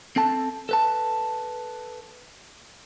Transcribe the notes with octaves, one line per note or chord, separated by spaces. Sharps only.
C4 A4 A5
A4 B4 A5